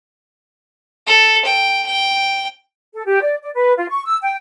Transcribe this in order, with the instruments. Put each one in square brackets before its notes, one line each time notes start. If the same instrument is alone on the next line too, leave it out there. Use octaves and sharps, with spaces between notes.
[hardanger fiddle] A4
G5
G5
[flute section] A4
G4
D5
D5
B4
F4
C#6
E6
G5